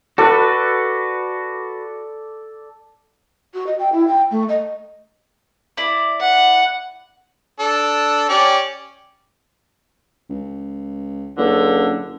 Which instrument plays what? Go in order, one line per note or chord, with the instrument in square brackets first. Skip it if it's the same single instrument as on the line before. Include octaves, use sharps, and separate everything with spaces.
[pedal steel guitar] F#4 B4 [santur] A4 D5
[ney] F#4
D#5
G5
E4
G5
A3
D#5
[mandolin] E4 D5
[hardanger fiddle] F#5
[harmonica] D4 A4
C#4 G4 D5
[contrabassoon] C#2
[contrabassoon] F#1 [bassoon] C#2 [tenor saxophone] D3